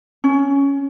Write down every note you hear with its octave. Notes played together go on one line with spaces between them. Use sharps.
C#4